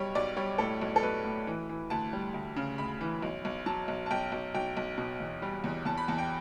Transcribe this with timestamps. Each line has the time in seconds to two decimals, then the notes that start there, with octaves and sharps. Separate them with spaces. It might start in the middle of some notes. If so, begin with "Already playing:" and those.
Already playing: B1 G3 C#5
0.15 B1 D5
0.36 G3 C#5
0.58 A2 A4
0.82 B1
0.96 A4
1.03 B1 B4
1.24 A2
1.47 E3
1.69 E3
1.90 D2 A5
2.13 G3
2.34 D2
2.56 C#3
2.78 D2 B5
3.01 E3
3.22 B1
3.45 B1
3.66 F#3 A5
3.88 B1
4.06 A5
4.11 B1 G5
4.32 B1
4.54 B1 G5
4.77 B1
4.97 B2
5.20 E2
5.42 G3
5.64 E2
5.85 E2 A5
5.98 B5
6.08 E2 A5
6.18 G5